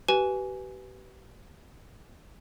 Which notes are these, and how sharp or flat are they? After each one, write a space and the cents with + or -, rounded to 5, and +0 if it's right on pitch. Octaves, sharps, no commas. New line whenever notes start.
G4 -40 B4 +0 G#5 +5